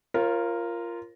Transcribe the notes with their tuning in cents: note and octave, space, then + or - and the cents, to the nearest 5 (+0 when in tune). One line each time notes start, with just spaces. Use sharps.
F4 -15 A#4 +0 C#5 -45